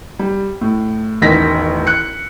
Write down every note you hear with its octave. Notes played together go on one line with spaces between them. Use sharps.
G3
A2
E1 A1 D#3 A#6 B6
F#6 C#7